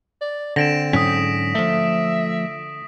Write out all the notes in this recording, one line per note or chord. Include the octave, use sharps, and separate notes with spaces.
D5
D3 C4 A#6 D7 E7
G#2 F#3 C#4 D#6 B6
F3 A3 E5